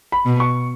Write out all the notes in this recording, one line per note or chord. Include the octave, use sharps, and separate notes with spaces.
B5
B2
C#6